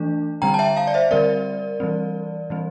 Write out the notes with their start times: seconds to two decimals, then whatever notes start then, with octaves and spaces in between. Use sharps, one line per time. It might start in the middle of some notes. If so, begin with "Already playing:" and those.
Already playing: E3 A3 D4
0.42 D3 G3 C4 G5 A#5
0.54 A5
0.59 E5 G5
0.77 F5 A5
0.87 D5
0.94 C5 E5
1.11 D3 G3 C4 A#4 D5
1.80 E3 G3 C4
2.50 E3 G3 C4